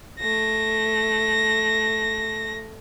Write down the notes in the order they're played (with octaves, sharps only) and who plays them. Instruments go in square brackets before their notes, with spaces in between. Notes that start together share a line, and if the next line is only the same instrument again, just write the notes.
[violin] A3 A#6